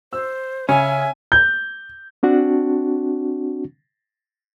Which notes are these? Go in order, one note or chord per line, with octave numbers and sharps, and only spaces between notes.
C5 E6
C#3 C#4 E5 G#5
G6
C4 D4 F#4